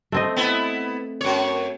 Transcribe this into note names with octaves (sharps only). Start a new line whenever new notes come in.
A3 C4 D#5
B3 E4
F#2 C#5